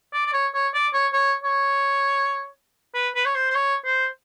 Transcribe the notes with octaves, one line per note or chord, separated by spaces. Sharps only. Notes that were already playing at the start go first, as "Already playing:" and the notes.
D5
D5
C#5
C#5
D5
C#5
C#5
C#5
B4
B4
C#5
C5
C5
C#5
C5